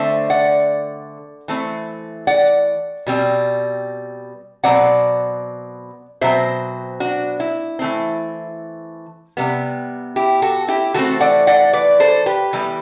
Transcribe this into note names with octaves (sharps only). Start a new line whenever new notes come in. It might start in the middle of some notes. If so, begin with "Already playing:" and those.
Already playing: D3 A3 C4 C5 E5
D5 F#5
E3 A3 C4
D5 F#5
B2 G3 C4
B2 F#3 C4 D5 F#5
B2 F#3 C4 C5 E5
D4 F#4
E4
E3 A3 C4
C3 G3 B3
E4 G4
F#4 A4
E4 G4
E3 A3 C4 F#4 A4
D5 F#5
D5 F#5
B4 D5
A4 C5
G4 B4
E3 G3 B3